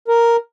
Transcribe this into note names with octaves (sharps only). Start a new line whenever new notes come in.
A#4